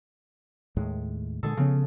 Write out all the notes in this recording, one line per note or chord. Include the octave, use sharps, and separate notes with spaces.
D#2 A2 G#3
A#2 D3 G#3 G#4 A4
C#3 F3 B3 C#4